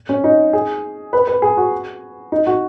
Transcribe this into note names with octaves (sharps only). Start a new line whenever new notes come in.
C#4
D#4
G#4
B4
B4
G#4
F#4
D#4
F#4